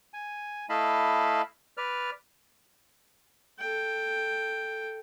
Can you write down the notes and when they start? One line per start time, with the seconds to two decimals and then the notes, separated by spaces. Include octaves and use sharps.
0.14 G#5
0.70 A3 E4 D#5 F5 A5 B5
1.77 B4 D5 F6
3.59 A4 G5